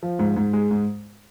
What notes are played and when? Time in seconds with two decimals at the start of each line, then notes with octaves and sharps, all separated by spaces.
0.03 F3
0.19 G#2
0.36 G#2
0.53 G#3
0.71 G#2